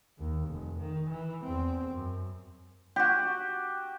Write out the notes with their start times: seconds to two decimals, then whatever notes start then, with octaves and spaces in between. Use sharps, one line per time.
0.19 D#2
0.50 F1
0.80 D#3
1.10 E3
1.44 E2 C4
1.92 F#2
2.96 F#4 G4